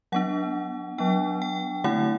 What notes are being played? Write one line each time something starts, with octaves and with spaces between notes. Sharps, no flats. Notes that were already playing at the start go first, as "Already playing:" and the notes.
F#3 B3 D4 F#5
F#3 B3 D4 G5
G5
D3 A3 C4 E4 F#5